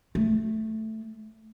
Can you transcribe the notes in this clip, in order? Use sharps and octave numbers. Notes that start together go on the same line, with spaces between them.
A3